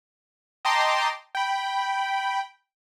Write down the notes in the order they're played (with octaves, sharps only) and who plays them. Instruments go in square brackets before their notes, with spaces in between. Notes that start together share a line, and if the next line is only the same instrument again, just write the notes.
[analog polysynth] D#5 G5 A5 A#5 C6 D6
G5 B5